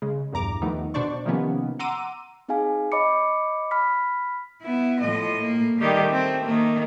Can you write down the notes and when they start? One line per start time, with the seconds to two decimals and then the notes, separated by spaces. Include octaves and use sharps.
0.02 C#3 G#3
0.32 A#1 E2 G2 A#5 D6
0.62 D#2 D#3 F3 A3 B3 D#4
0.94 B2 D4 C5 D5 C#6
1.25 C3 D#3 F3 A#3 B3 C#4
1.79 F#5 A#5 C6 D6 E6 D#7
2.48 C4 D#4 G#4 F5 G#5
2.92 C#5 D#5 B5 D6 C#7
3.71 B5 F6 B6
4.62 B3 E4
5.00 A2 F3 D#5
5.39 A#3
5.81 D#3 G3 A3 G4
6.11 C4
6.46 D#3 A#3